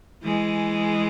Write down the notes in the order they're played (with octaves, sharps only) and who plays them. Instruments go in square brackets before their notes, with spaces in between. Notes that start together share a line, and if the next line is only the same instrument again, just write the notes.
[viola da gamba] E3 G#3